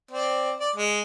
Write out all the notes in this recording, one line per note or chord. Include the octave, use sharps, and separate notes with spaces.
C4 D5
D5
G#3